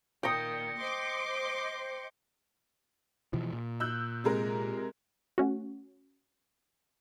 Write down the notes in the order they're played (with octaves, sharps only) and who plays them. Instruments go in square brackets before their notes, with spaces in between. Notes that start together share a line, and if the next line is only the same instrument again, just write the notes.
[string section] A#2 D#3 [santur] G5 D#6 [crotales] G6 A#6 C#7
[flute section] C5 D#5 [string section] C6 D6
[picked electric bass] B2 E3 F3
A#2
[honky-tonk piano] E6 F#6 G6
C3 G#3 A#4
[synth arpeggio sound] A3 C#4 F#4